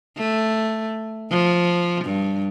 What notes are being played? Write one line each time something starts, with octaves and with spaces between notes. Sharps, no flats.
A3
F3
G2